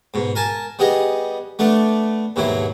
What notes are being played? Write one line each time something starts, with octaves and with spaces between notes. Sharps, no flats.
G#2 B2
A#4 G#5 A5
G3 B3 G#4 D#5
A3 B3 D4
D#2 G#2 B2 F#3 E4